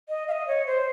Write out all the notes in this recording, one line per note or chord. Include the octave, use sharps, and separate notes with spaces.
D#5
F5
D#5
C#5
C5